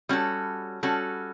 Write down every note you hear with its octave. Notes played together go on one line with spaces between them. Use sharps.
G3 C#4 F#4 A4
G3 C#4 F#4 A4